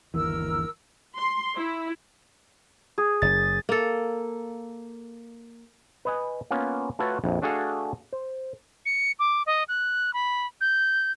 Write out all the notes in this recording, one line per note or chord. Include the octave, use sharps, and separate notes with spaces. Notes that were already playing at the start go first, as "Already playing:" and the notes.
G1 D#2 E3 A#4 E6
C6
E4
G#4
F#1 A6
A#3 A4
B4 D#5 G#5
A#3 B3 C#4 F4
A3 F4 F#4 A4 B4 C#5
A#1 F2
A3 D4 F#4 G#4 A4 F5
C5
C#7
D6
D#5
F#6
B5
G6